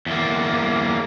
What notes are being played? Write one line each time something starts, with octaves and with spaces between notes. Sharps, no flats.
E2 A#3